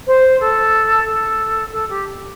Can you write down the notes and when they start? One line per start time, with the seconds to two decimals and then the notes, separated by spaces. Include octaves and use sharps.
0.07 C5
0.40 A4
1.06 A4
1.72 A4
1.89 G4